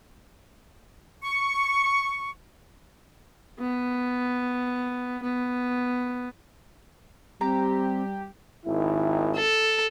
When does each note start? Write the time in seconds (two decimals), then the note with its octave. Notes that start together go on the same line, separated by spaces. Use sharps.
1.23 C#6
3.59 B3
5.22 B3
7.41 G3 C4 G4 A#5
8.66 G#1 D#3 E4
9.36 A4